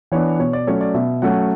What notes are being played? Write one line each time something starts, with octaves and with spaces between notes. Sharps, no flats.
E3 B3 D4 C#5
B2 C#5
D5
F#3 A3 C#4 C#5
D5
B2 E5
F#3 A3 C#4 F#5